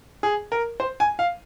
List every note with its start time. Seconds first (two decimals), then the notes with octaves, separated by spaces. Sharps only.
0.23 G#4
0.52 A#4
0.80 C5
1.00 G#5
1.19 F5